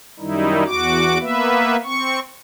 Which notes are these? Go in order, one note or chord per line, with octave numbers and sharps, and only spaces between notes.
F#2 D#3 G3 D#4 E4
E2 F#4 D6
A#3 B3 B4 E5
C4 C#6